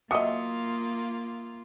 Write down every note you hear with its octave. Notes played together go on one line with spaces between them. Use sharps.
F#3 A#3 F4 D#5 E5 D#6 C#7